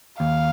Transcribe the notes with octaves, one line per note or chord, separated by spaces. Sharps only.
D#2 F5